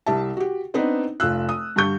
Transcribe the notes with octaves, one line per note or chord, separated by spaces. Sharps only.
C2 G4 E5 A5
F#4 G4
B3 C4 D4 D#4 B4
F1 F4 E6 F#6
D#6
G2 D3 G3 C#6 G6